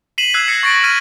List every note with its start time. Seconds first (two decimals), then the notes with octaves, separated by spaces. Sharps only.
0.18 B6 C7 D#7 E7 F#7
0.34 E6 F#6 G#6 C7 F#7
0.48 A#6 C7 C#7 E7
0.63 C#6 A6 A#6 D7
0.84 F6 G#6 D#7 F#7